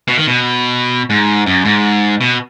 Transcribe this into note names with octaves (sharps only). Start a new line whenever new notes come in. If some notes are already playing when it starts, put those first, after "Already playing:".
B2
D#3
B2
G#2
F#2
G#2
B2